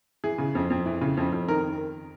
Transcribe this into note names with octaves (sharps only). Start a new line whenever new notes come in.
E3 G#4
C#3
F2
F2
E3
C#3
F2
F2
D#3 A#4